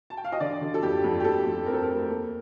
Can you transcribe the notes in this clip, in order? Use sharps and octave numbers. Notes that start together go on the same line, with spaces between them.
A5
G5
F5
D#5
D3 D5
D3
A4
F2 G4
F2
G4
F2 A4
F2
C4 A#4
A4
A#4
A3
D#2